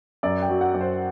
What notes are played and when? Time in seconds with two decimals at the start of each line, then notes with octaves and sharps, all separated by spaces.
0.23 F#2 D5
0.42 G5
0.49 F#3
0.61 F#5
0.74 F#2
0.81 C5